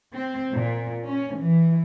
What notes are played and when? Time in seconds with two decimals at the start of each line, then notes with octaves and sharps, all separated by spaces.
0.14 C4
0.52 A#2
1.06 C#4
1.37 E3